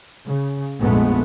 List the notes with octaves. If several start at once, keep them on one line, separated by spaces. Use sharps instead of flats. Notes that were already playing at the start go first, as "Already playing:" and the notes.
C#3
A#1 F2 G#2 G#3 A3 B3